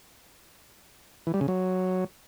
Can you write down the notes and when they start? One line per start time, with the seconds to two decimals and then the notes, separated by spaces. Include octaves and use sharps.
1.27 E3
1.34 G3
1.41 C#3
1.48 F#3